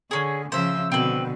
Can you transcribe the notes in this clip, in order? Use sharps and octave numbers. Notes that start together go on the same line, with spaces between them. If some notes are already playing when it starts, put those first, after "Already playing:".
D3 C#4 G#4
C#3 F3 C5 E5
B2 D3 C4 B4